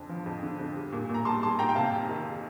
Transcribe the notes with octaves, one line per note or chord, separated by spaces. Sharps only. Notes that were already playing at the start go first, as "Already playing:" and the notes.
Already playing: F2 D3
F3
F2
D3
F2
G3
A#2
A#2
A#5
G3 A5 C6
G3 A5 C6
A#2 G5 A#5
G5
C3 F5 A5
F2
D#3